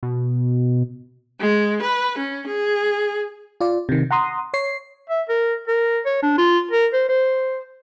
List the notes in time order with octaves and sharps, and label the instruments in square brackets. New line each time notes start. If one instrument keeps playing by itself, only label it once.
[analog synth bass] B2
[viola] G#3
B4
C#4
G#4
[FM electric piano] F4 D5
C3 D#3
F#5 A#5 C6 D#6
C#5 C7
[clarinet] E5
A#4
A#4
C#5
D4
F4
A#4
C5
C5